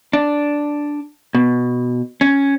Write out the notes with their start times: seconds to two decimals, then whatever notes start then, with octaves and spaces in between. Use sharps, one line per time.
0.13 D4
1.35 B2
2.21 C#4